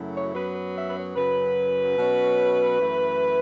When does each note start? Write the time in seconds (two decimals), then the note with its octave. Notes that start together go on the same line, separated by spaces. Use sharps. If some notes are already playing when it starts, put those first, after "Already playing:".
Already playing: F#2 C#3 F#3 A3 E4
0.14 C#5
0.34 F#2 F#3 B3 B4
0.55 B4
0.75 E5
0.89 B4
0.96 C#5
1.16 F#2 C#3 F#3 B4
1.98 B2 F#3 C#4
2.80 F#2 E3 A3